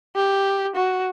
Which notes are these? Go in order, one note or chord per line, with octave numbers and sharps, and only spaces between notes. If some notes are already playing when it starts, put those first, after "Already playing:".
G4
F#4